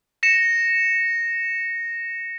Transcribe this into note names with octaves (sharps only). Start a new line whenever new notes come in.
A#6 C#7 E7